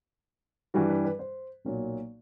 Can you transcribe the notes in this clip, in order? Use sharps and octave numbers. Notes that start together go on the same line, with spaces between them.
G2 E3 G3 F#4
B4
B4
C5
B1 A#2 F#3